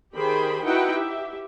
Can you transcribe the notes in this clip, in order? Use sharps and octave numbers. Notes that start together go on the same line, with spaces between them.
D#3 G4 G#4 C5 G5 B5
D#4 E4 F#4 B4 F#5 G5
G4 E5